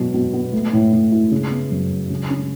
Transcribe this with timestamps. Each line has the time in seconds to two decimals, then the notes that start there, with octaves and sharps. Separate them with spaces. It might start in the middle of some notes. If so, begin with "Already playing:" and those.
Already playing: B2 F#3
0.14 B2
0.33 B3
0.53 A3
0.73 A2
0.93 A2
1.12 E4
1.31 C#3
1.51 B3
1.72 F#2
1.90 F#3
2.10 C#3
2.30 C#4